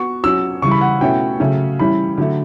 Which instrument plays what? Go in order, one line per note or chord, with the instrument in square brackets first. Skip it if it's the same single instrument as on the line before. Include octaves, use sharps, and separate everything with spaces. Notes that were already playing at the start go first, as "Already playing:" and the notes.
Already playing: [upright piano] B3 F#4 [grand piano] C#6
[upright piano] F#3 C#4 F#4 [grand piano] E6
[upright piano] C#3 E3 G3 [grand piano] C#6
[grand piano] B5
F#5
[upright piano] B2 A3 C#4 E4 [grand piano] G5
[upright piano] C#3 F#3 A3 C#4
[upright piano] E3 G3 C#4 E4 [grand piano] B5
[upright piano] D3 F#3 A3